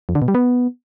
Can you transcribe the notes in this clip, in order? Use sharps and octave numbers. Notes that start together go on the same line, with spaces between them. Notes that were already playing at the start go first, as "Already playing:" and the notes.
F2
D3
B2
G3
B3